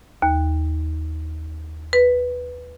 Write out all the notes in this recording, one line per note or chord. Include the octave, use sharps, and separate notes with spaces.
D#2
B4